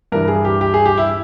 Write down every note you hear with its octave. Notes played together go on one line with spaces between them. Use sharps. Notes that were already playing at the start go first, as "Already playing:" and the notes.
G2 E3 A#4
G#4
G4
G4
G#4
G4
E4